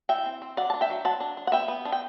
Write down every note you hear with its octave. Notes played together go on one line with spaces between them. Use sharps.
E3 E5 G5
C4
C4
F#3 D5 F#5
A5
D4
E5 G5
F#3
F#3 F#5 A5
D4
D4
F#5
B3 E5 G5
B3
D4
G5